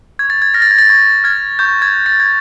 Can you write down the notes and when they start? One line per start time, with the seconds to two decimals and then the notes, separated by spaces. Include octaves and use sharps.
0.19 C#6 G#6
0.30 A6
0.42 G#6
0.54 F6 A#6
0.62 A6
0.71 G#6
0.79 A6
0.89 C#6 G#6
1.24 F6 G#6
1.59 C#6 G6
1.82 G#6
1.94 F#6
2.06 A6
2.20 G#6